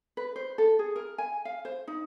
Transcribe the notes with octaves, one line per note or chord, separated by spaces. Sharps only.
B4
C5
A4
G#4
A#4
G#5
F5
C5
D#4